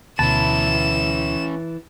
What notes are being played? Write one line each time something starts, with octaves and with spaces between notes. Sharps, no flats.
D2 B2 E3 C#4 B4 A5 E7